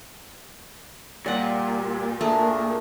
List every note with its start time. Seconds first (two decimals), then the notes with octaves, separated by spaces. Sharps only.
1.26 A#2 G3 G4 D5 F#5
2.21 A3 D4 G#4 A#4